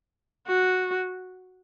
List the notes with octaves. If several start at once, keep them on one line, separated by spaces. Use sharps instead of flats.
F#4